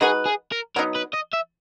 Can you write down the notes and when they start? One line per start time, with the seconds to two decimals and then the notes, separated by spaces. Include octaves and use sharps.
0.01 G#3 D#4 F#4 G#4 B4
0.26 G#4
0.52 A#4
0.76 F#3 B3 D#4 A#4
0.95 B4
1.13 D#5
1.33 E5